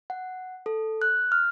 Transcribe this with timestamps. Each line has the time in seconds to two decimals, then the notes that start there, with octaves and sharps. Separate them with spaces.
0.10 F#5
0.66 A4
1.02 F#6
1.32 F6